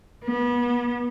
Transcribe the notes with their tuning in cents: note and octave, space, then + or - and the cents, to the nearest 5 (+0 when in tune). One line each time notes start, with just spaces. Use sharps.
B3 -30